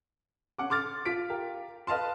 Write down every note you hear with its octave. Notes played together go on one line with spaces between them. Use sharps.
C#4 F#5 D6
C6 D6 F6 A6
F4 B6 D7
G4 A#4 F5
B4 D#5 F5 A5 C6